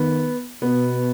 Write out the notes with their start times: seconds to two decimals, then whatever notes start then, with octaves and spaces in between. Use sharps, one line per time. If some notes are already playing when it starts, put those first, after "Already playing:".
Already playing: D#3 B3
0.62 B2 B3